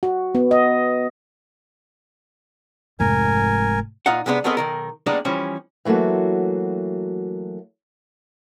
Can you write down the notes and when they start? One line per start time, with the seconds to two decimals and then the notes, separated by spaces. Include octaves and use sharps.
0.03 F#4
0.35 B3
0.51 D#5
3.00 F1 G#2 A#4 G#5
4.06 A#2 D#4 F4 F5 F#5
4.26 C3 G#3 B3 C4 D4
4.44 A3 B3 C4 G#4 A#4 D#5
4.57 B1 D#3 A#4
5.06 G3 G#3 A#3 B3 D4 D#4
5.25 E3 F3 G3 C#4
5.85 E3 F#3 A3 A#3 F#4